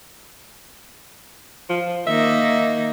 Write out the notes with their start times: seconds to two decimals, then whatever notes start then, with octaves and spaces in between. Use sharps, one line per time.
1.69 F3
2.07 D#3 A#3 D#4 E5